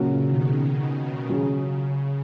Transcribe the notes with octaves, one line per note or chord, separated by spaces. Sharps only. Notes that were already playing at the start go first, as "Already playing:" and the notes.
Already playing: A#2 C#3 F#3 C#4 F#4
B2 D#3
C#3
C#3 F#3 C#4 G#4